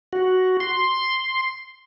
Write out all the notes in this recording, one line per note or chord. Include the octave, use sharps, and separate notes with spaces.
F#4
C6